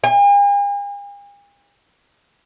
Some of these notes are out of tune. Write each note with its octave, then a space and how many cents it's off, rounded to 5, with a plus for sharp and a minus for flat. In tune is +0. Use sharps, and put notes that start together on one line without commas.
G#5 -45